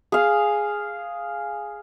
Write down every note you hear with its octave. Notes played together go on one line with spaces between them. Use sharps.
G#4 F5